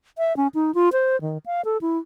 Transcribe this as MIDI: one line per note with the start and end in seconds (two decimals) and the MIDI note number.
0.18 0.36 76
0.37 0.48 61
0.55 0.74 63
0.75 0.89 65
0.93 1.20 72
1.21 1.38 51
1.46 1.61 77
1.65 1.77 69
1.81 1.98 64